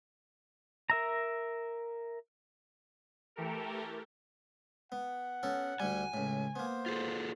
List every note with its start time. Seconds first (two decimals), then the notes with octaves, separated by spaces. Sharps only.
0.90 A#4 E5 A#5
3.36 E3 A3 G4 A4 A#4
4.92 B3 F#5
5.43 B3 C#4 A4
5.80 D2 G3 G#5
6.14 C#2 A2
6.56 A#3 B3 C5
6.86 F4 G#4 A4